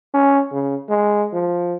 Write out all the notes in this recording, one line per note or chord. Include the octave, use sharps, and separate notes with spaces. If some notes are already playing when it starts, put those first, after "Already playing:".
C#4
C#3
G#3
F3